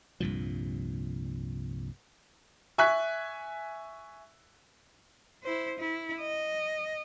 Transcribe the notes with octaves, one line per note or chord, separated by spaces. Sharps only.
C2 G2 A#2 F3
E5 G#5 C#6 F#6 B6
E4 C5
E4
D#5